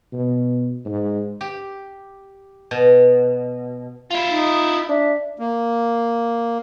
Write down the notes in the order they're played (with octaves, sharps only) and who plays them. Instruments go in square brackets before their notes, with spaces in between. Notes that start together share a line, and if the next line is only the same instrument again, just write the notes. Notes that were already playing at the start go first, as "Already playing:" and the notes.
[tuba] B2
G#2
[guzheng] G4
B2
[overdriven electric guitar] E4 F4
[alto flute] D#4
[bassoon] D4 [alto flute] E5
[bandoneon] A#3